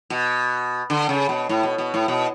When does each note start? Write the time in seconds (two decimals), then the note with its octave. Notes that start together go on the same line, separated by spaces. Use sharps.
0.10 B2
0.90 D3
1.09 C#3
1.29 B2
1.49 A2
1.63 B2
1.78 B2
1.94 A2
2.08 B2